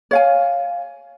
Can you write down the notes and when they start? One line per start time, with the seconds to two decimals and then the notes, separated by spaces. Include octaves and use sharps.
0.11 C#5 F5 G#5